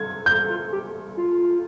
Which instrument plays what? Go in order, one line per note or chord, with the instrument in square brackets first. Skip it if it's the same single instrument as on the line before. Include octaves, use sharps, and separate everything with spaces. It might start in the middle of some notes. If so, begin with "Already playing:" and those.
Already playing: [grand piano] G#6
G6
[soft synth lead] F4
G4
F4